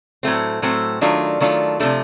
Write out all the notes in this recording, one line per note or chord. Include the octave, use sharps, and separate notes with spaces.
A2 F#3 A3 C4
A2 F#3 A3 C4
D#3 F#3 A3 D4 F4
D#3 F#3 A3 D4 F4
C3 F3 A3 D4